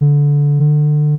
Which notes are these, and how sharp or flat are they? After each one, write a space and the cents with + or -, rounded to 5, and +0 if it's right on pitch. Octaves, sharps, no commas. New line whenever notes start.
D3 -20
D3 +25